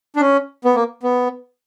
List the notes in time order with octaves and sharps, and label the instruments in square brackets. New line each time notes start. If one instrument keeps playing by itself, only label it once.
[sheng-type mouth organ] D4
C#4
B3
A#3
B3